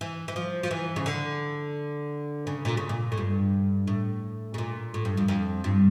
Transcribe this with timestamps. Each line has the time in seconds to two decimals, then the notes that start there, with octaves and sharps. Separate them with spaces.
0.01 E3
0.28 E3
0.36 F3
0.63 F3
0.71 E3
0.96 C#3
1.06 D3
2.47 C#3
2.65 A#2
2.77 C#3
2.89 A#2
3.12 A2
3.17 G2
3.87 A2
4.54 C#3
4.58 A#2
4.94 A2
5.05 G2
5.17 F2
5.28 F2
5.64 G2